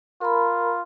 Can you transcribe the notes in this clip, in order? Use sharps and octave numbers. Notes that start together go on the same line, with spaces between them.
F4 A#4 A#5 B5